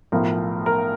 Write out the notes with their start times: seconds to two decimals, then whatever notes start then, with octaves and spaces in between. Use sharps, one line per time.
0.12 B1 A2 F3 A#4
0.66 A#4